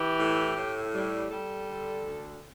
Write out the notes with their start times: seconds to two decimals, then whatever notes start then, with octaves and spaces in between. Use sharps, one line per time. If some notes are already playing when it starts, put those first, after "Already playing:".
Already playing: E3 G4
0.20 A2
0.57 A2
0.95 G3
1.31 G3 A4
1.68 D3
2.06 D2